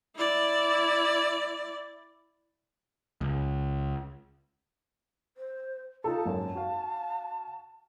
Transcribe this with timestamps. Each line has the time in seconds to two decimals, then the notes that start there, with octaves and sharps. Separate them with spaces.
0.16 E4 D5
3.21 C#2
5.37 C5
6.04 D#4 F4 A4 A5
6.25 G#1 F#2
6.55 F#4 F5